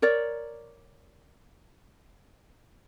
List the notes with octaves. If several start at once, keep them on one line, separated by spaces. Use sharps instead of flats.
A#4 C#5 D5